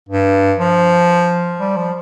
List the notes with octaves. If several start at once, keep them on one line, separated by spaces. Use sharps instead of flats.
G2
F3
G3
F3